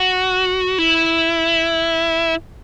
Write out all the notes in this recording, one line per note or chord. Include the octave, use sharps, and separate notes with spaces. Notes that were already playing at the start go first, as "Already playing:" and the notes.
Already playing: F#4
E4